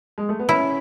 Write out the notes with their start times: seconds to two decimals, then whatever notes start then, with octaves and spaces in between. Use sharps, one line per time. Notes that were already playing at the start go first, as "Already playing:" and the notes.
0.18 G#3
0.29 A3
0.39 B3
0.49 C#4 E4